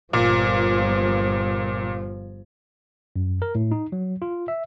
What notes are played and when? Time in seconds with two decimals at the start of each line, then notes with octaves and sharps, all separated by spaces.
0.13 G1 A#2 F3
3.16 F#2
3.42 A#4
3.55 A2
3.71 D#4
3.92 F#3
4.22 F4
4.48 E5